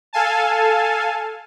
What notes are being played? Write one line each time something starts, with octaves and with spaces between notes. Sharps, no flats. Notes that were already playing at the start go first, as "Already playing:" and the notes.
A4 F5 G#5 A5